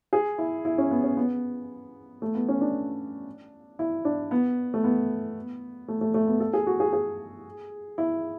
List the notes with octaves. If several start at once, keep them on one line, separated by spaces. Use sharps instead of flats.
G#4
E4
E4
C#4
B3
C#4
B3
A3
B3
C#4
D4
E4
D4
B3
A3
B3
A3
A3
A3
B3
A4
G#4
F#4
G#4
G#4
E4